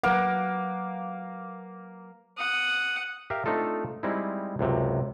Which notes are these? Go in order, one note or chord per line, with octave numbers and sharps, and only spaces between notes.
F#3 A#3 B4 F#5
F#5 D#6
G4 A#4 E5 F5
A3 C4 D4 D#4 F4 A4
G3 G#3 C4 D#4 E4
C#2 F#2 C3